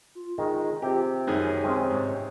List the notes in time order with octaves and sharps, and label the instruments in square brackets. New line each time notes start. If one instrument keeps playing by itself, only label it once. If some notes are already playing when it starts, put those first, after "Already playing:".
[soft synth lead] F4
[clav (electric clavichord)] D#3 [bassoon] G#3
[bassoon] C3 [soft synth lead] F4 [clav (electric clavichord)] G4
[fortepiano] F#2 D#3 G#4 [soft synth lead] C#5
[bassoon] C3 [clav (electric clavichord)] G#3 C4 C#4
[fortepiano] G#2